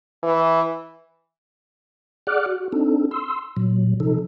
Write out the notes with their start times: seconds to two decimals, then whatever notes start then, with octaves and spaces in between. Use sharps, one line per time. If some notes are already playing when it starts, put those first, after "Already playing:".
0.23 E3
2.27 G#4 D5 F#5 D6 F6 F#6
2.46 F#4
2.72 C4 D4 D#4 A4
3.11 C6 E6
3.57 A#2 F#3
4.00 C3 F3 D#4 A4